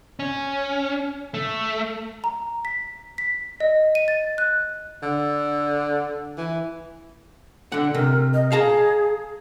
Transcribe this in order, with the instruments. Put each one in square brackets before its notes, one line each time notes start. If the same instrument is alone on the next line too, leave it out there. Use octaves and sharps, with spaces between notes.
[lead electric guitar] C#4
A3
[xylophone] A#5
B6
B6
D#5
D#7
A6
F#6
[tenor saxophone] D3
E3
[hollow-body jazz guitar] D3 F#5
[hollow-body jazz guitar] C3 [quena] A#4
[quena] D#5
[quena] G#4 [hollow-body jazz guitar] F5 A5 A#5